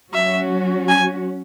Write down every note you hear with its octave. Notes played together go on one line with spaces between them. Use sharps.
F#3 C#4 F#4 E5
G#5